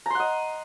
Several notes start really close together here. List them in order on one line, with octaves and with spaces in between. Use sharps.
A#5 C6 F#5 D#5